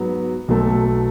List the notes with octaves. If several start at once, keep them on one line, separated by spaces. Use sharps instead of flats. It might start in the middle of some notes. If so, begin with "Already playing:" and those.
Already playing: G#2 F#3 B3
B1 B2 F#3 A3